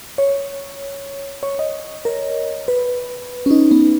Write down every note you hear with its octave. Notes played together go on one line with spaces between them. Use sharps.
C#5
C#5
D#5
A#4
B4
C#4
D#4
B3